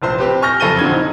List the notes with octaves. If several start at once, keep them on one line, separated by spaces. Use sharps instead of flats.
F1 A#1 C5 C6
C4 G4 B4
G#5 C#6 F6 G6 A#6
F#1 F2 A4 A#6 D#7 G7
D#1 D3 C4 G#6
D#4